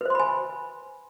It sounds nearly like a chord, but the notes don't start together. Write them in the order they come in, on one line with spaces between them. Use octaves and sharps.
B4 C5 C6 B5 G#5